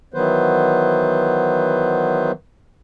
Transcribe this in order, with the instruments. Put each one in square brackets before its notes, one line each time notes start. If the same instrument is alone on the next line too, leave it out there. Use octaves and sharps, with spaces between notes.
[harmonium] D#3 E3 F#3 B3 B4 C5